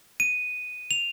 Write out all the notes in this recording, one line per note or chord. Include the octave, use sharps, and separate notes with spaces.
D#7
F7